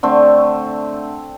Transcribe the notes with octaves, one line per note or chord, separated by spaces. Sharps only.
D3 A3 C4